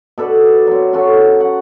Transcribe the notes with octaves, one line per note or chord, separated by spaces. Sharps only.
B2 A4 B4 D5
F#3 C4
C#4 F#4 A4
F#5